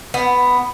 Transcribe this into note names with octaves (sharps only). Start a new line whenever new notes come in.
B3